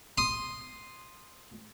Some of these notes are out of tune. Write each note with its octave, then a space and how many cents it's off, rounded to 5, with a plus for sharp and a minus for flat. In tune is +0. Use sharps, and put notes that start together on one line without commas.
C6 +0 D#6 -5